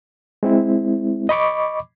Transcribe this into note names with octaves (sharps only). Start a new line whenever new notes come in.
G#3 C4 E4
D#5 B5 C#6 D6